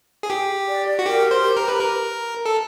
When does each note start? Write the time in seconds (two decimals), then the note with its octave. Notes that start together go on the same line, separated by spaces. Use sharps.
0.23 G#4
0.30 G4
0.68 D5
0.99 F#4
1.06 G4 A#4
1.31 C5
1.43 G4
1.57 A#4
1.68 B4
1.80 A#4
2.46 A4